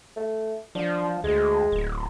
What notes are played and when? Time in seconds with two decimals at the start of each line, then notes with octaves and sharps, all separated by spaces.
0.16 A3
0.75 F3 D4
1.24 D2 G#3
1.72 D1